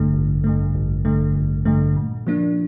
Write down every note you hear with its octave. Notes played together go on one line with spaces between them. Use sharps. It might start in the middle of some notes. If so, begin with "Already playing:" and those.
Already playing: A1 G2 D3 A3
A1
G2 D3 A3
A1
G2 D3 A3
A1
G2 D3 A3
A#2
F3 A#3 D4